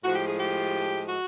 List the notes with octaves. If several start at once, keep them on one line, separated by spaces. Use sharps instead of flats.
A2 F3 G#3 F#4
G4
G#4
G4
F#4